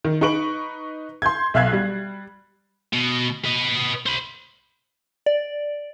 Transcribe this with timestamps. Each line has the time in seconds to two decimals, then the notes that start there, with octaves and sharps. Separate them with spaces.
0.05 D#3
0.21 D#4 B4 C#6 D7 F#7
1.22 C6 G6 G#6
1.54 B1 E5 F5 F#6 G#6 C7
1.73 G3
2.93 B2
3.45 B4 D#5
4.06 C5 B5
5.26 D5